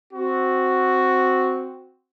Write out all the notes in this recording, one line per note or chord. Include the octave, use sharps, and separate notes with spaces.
C4 F#4